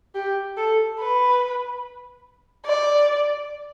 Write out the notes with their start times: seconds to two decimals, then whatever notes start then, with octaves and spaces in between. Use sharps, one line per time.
0.15 G4
0.57 A4
0.99 B4
2.65 D5